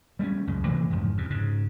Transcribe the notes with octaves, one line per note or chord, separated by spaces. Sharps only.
G3 A3 B3 C#4
C#2 F#2 C#3
C3 E3 A3 A#3
F#1 F2 G#2 F3
E2 C3
G#2 C#3